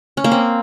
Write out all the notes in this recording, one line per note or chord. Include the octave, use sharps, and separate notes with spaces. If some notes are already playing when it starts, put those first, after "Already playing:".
C#4
A#3
C4